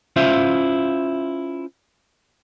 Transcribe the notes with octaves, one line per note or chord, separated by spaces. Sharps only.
C#4 E4 F4 C5 E5 F5